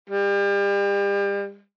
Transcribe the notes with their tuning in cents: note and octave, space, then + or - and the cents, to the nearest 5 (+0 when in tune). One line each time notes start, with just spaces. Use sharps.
G3 +35